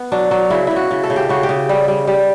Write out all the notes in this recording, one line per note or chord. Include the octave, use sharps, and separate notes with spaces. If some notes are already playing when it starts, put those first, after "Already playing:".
Already playing: B3
F#3 D4
F#3
C#3 E4
C#3 E4
F#4
C#3
A4
C#3
G4
C#3 F#4
G4
C#3
G3
G3
G3